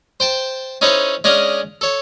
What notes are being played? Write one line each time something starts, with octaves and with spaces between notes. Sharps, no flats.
C5 G5 A5
C#4 D#4 E4 A4 C5 C#5
G#3 C#4 D4 D#5 F5
A4 C#5